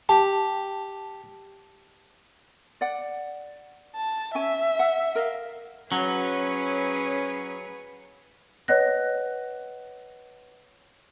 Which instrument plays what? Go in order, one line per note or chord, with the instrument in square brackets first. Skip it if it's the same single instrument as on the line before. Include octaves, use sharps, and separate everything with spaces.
[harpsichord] G4 [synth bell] A5
[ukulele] D5 F#5
[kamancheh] A5
[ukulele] C#4 G#5 [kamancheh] E5
[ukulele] F#5
A#4 D#5 F5
[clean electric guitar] F#3 [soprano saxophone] C#4 [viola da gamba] G#4 B4 C#5
[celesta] B4 C#5 D#5 F#5 F#6 A#6